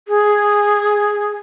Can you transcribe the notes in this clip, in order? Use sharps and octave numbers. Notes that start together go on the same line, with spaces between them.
G#4